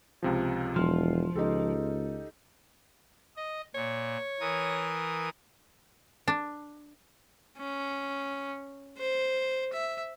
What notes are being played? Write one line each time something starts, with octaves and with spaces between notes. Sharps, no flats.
C#2 C3 F3
E1 F3 C6 F6
C#2 D#4 G4 A4
D#5
A#2 C#5
E3 A#4 D#6
D4
C#4
C5
E5